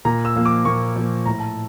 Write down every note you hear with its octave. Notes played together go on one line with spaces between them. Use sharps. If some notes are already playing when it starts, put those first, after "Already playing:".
A#2 A#5
E6
F3 A#3
D6
A#2 C#6
F3 A#3
A2 A#5
A5